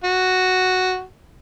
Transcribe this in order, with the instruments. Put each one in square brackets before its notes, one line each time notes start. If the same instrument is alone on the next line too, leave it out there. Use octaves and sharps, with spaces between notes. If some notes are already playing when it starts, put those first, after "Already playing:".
[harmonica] F#4